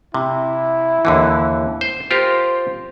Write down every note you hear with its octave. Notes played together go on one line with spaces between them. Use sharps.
C3 E4
D#2 D3 E3
C5
F4 G4 A#4 C5